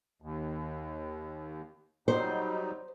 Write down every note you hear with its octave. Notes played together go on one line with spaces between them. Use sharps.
D#2
F#3 G3 D#4 C5